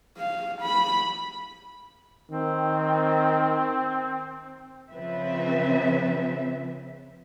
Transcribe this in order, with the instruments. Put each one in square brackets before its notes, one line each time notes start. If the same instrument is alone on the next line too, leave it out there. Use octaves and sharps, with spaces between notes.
[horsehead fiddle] F5
B5
[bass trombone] D#3 [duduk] C4
[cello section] C#3 F3 C4 B4 E5